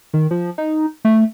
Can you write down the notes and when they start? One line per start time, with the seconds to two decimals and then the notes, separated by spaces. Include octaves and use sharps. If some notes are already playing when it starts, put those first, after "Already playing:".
0.14 D#3
0.31 F3
0.58 D#4
1.05 A3